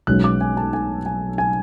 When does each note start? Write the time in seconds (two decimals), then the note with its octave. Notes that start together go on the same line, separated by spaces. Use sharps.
0.07 B1 B2 G#3 C#4 F#6
0.24 D6
0.41 G#5
0.57 A5
0.73 G#5
1.06 G#5
1.38 G#5